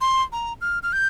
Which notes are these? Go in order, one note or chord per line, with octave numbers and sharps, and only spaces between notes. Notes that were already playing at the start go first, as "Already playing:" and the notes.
C6
A#5
F6
F6
G6